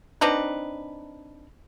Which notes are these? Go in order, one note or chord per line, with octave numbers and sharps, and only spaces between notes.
C4 D4 D#4 B4